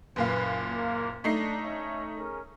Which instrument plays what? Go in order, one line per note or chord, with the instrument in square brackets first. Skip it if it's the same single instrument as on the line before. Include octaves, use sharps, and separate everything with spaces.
[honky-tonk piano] F#1 A#2 F5 [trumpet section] B4
[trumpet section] A#3
[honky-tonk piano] A3 D#4 C7 [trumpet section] D4
[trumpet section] C#4 C#5 E5
C#4 G#4 A#4